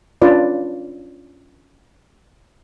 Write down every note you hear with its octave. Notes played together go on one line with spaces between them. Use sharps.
C#4 D4 F4 B4 D5